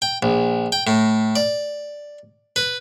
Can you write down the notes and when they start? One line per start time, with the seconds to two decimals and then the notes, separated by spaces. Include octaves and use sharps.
0.02 G5
0.23 A#1
0.72 G5
0.87 A2
1.36 D5
2.56 B4